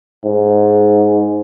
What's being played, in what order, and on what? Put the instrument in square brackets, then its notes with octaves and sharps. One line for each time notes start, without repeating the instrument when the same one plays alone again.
[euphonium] G#2